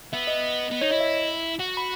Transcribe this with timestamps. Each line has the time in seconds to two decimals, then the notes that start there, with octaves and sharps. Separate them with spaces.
0.13 B3 E5
0.27 D#5
0.71 B3
0.81 D#4 C#5
0.91 E4 D#5
1.01 E5
1.59 F#4 F#5
1.77 B5